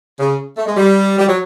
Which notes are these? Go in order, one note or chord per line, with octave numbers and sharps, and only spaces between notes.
C#3
A3
G#3
G3
G3
F#3